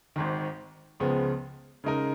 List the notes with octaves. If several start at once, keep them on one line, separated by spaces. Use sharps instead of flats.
G#1 G#2 D#3
C#2 C#3 F3 G#3 B3
C#3 G#3 D#4 A#4